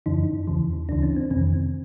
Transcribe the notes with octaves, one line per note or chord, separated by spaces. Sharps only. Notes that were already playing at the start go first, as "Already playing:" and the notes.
F#2 C#3 E3 D#4
E2 C#3 E3
D2 C#3 E3 D4
C#4
C4
F2 C3 D#3 C4